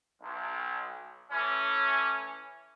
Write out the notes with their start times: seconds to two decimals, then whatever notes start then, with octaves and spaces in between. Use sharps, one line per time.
0.21 B1
1.31 E3 A3 C#4